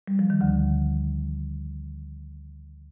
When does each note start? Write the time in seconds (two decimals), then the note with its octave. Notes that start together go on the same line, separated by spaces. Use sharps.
0.08 G3
0.19 F3
0.30 D#3
0.41 D2 D3